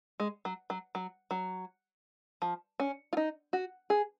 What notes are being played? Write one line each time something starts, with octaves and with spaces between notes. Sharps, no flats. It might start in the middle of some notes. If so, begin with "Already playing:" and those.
G#3
F#3
F#3
F#3
F#3
F3
C#4
F4
D#4
F#4
G#4